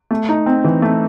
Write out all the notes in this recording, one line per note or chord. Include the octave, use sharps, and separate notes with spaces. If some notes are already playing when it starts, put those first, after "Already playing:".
A3
D#4
C4
E3
A3